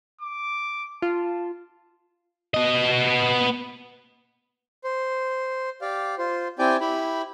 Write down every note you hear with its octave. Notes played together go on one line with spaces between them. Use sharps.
D6
F4 A5
B3 D#5
C5
G4 D5 F5
F4 C5
C4 E4 G4 D5 G5 G#5
E4 G4 B5